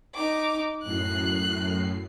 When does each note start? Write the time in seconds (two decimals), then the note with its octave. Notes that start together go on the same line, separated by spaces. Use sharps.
0.15 D#4 D6
0.83 F#2 A2 F#6 C7